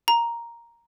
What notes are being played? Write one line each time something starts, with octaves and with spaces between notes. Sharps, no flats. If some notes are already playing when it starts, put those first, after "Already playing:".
A#5